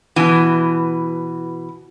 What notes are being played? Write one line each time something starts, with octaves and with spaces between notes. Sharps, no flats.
B2 E3